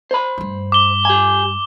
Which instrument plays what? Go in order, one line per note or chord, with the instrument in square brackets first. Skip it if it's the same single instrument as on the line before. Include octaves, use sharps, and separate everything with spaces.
[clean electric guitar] C5 B5
[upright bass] G2 A3
[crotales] D6 G7
[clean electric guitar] G4 G#5